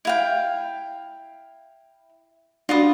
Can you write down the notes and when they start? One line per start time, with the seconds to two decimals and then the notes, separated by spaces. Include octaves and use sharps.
0.05 E4 F5 G5
2.69 D4 F4 F#4 B4 D#6